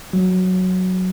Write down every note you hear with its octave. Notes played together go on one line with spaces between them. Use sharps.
F#3